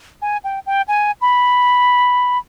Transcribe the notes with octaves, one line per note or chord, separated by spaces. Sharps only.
G#5
G5
G5
G#5
B5